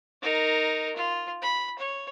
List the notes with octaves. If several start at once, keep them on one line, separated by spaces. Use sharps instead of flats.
D#4 A#4
F4
B5
C#5